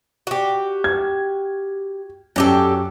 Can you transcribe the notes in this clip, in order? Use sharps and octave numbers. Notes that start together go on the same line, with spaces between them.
F#4 G4
G#6
F#2 F#3 G4 A4